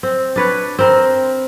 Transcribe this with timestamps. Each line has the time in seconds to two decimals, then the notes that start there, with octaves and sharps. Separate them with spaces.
0.03 C4
0.36 D4 B4 C#5
0.79 C4 A#4 C5